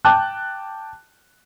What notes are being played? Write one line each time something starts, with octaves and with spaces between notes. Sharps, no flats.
G5 A5 D6 F#6